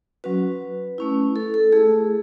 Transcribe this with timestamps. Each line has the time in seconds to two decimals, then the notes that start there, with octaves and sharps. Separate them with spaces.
0.24 F#3 C#4 F#4 B4
0.98 A3 C#4 E4
1.36 A4
1.54 A4
1.72 A3 E4 G#4